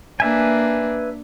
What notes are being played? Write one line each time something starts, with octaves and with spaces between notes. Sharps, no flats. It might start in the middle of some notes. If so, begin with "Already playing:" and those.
A#3 D4 B4 E5 G#5